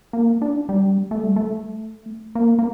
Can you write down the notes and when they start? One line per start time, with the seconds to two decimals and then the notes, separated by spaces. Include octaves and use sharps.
0.13 A#3
0.42 D4
0.69 G3
1.11 A3
1.23 G3
1.36 A3
2.35 A#3
2.59 A#3